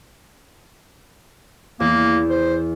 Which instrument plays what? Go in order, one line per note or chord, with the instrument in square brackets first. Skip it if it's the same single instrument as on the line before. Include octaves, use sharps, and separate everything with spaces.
[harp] E2 E3 [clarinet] A#3
[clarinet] C5